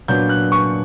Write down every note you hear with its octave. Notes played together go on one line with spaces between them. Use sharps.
A#2 F#3 B3 D4 G6
F#6
C#6